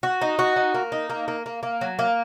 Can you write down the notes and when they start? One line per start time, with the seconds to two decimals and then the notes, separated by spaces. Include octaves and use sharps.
0.03 F#4
0.21 D#4
0.39 F#4
0.56 D#4
0.74 A#3
0.92 D#4
1.10 A#3
1.28 A#3
1.46 A#3
1.63 A#3
1.81 F#3
1.99 A#3